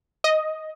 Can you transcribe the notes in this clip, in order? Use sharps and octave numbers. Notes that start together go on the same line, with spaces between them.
D#5